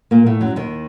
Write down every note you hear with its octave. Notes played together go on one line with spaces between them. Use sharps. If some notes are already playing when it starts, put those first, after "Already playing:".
A#2 A#3
A2 A3
F#2 F#3
D#2 D#3